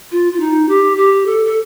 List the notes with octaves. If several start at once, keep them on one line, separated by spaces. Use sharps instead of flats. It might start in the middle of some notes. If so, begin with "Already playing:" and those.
F4
F4
D#4
G4
G4
A4
A4